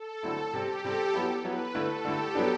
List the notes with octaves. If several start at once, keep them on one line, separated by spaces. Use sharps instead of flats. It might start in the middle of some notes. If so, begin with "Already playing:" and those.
Already playing: A4
D3 F#3 A3 C4 E4 A4
C3 G3 C4 G4
C3 G3 C4 A4
F#3 B3 E4
F#3 B3 E4 B4
D3 A3 E4 A4
D3 A3 E4 G4
F#3 B3 D4